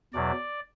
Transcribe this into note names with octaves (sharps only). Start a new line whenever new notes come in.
E2 B2 F#3 D5